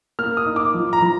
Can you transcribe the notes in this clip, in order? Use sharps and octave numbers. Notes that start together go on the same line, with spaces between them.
A#3 F6
D#6
D#4
D6
F3
A#5
F3